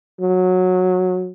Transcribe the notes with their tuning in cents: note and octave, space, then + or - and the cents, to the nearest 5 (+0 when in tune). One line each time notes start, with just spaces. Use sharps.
F#3 -15